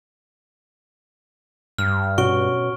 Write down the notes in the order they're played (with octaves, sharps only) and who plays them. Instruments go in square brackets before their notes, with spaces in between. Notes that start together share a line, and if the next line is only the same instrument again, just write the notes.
[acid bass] G2 [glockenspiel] F6
[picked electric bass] B2 C#4 [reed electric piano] F#4 [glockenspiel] C#6 D7 G7